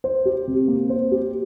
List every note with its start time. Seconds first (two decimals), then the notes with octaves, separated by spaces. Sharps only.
0.04 C5
0.26 G4
0.47 C3
0.68 A#3
0.90 C5
1.12 G4